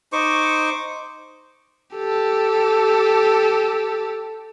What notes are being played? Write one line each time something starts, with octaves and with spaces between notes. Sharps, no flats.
D#4 C5 C#6 D6
G4 A4